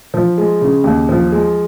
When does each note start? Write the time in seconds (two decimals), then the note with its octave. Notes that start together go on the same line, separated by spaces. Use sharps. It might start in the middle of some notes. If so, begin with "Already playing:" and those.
0.14 F3
0.38 G#3
0.61 C#3
0.84 D#2
1.09 F3
1.32 G#3